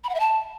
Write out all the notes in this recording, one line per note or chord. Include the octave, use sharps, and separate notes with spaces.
B5
F#5
E5
A5